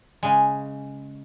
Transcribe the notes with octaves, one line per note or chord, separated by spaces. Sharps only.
C#3 G#3